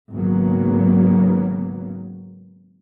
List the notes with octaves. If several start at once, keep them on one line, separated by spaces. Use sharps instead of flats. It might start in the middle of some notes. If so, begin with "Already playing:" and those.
G#1 C#3 F#3 A#3 B3